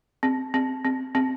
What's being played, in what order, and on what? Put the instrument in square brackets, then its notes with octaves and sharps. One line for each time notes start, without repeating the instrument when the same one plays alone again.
[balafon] C4
C4
C4
C4